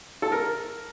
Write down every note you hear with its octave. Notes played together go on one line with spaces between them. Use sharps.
A4
A#4